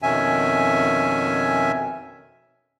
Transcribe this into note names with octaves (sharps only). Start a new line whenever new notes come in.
F2 B2 D#3 C#4 E5 G#5